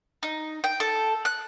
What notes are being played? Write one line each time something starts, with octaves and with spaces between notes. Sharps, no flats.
D#4
G5
A4
F#6